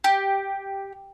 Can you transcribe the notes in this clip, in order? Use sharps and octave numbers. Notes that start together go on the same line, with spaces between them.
G4